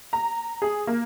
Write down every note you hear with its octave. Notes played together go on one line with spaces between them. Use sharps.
A#5
G#4
A#3